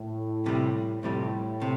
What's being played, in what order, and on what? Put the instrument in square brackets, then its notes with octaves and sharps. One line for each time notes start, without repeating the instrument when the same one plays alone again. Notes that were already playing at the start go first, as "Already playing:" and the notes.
Already playing: [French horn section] A2
[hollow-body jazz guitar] F2 C3 G3
[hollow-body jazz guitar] F2 C3 G3 [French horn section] A2
[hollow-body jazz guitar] C3